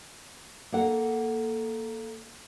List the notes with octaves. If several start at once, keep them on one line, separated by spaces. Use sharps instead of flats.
A#3 A4 F#5